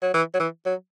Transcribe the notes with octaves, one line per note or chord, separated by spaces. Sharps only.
F#3
E3
F#3
E3
F#3